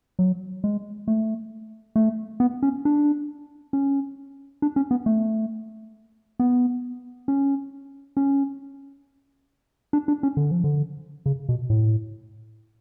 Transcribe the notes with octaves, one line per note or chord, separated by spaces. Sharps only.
F#3
G#3
A3
A3
B3
C#4
D4
C#4
D4
C#4
B3
A3
B3
C#4
C#4
D4
D4
C#4
D3
F3
D3
C#3
B2
A2